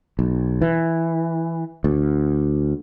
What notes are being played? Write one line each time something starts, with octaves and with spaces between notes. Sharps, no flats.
B1
E3
D2